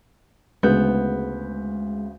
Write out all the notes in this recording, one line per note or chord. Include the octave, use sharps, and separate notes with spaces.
D2 C#3 G#3 B3 G6